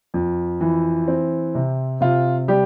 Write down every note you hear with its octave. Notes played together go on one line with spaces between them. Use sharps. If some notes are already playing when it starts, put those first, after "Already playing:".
F2
E3
C4
C3
C3 F4
G3 G4